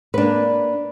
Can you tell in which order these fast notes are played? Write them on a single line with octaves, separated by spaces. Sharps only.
B4 D4 A#3